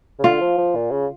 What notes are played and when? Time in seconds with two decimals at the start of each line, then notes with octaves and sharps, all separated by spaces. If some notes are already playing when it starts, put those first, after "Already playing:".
0.19 C#3
0.24 D3 F4
0.41 F3
0.58 F3
0.75 A#2
0.91 C#3